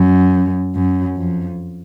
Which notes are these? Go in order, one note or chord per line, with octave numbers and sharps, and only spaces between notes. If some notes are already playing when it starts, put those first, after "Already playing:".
Already playing: F#2
F#2
F2